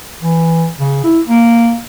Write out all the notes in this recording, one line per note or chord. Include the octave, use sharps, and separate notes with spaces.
E3
C#3
E4
A#3